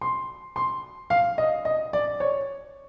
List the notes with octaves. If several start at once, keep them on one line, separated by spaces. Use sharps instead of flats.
C6
C6
F5
D#5
D#5
D5
C#5